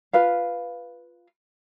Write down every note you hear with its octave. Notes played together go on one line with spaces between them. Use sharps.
F4 B4 F5